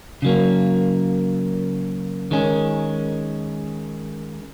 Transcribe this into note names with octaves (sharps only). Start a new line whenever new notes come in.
C#3 F#3 A#3
D#3 G#3 C#4